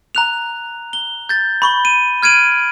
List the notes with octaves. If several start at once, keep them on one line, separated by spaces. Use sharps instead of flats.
A#5 F#6 F7
G7
G6 A6
B5 C#6 G7
D#7
F6 G#6 D7 D#7 F#7